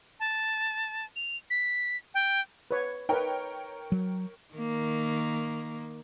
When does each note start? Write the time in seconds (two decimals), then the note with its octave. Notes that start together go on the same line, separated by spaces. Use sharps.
0.20 A5
1.16 F7
1.50 B6
2.14 G5
2.71 B4 C#5
3.09 D#4 A#4 B4 C#5 G5
3.92 F#3
4.54 D#3 A#3